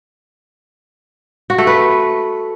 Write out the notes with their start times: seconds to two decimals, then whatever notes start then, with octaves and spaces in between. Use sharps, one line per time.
1.50 F#4
1.58 A3
1.67 B4